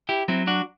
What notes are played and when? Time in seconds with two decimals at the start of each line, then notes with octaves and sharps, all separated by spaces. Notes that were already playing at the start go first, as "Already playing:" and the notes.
0.09 E4 G4
0.28 F#3 C4 E4
0.47 D4 F#4